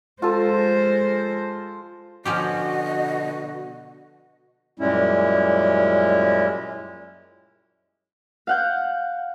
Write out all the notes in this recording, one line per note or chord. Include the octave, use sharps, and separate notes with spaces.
G#3 F4 A4 C5
B2 D3 F3 C#4 F#4 G4 D#5
F#2 A#2 G3 G#3 C#4 E4
F5 F#5 G6